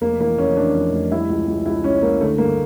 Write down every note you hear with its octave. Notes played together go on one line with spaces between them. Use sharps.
F1 A#3
E3 A#3
F1 C#4
E3 D4
F2
F1
G3 E4
C#2
C#2
C#2 E4
C#2 C#4
C#2 A#3
D3 A3
G2 A#3